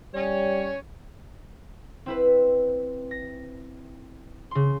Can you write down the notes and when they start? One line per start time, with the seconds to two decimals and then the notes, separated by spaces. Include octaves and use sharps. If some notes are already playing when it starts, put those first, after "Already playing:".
0.15 G3 C#4 C#5
2.06 C4 E4 B4
3.11 A#6
4.51 C#3 C6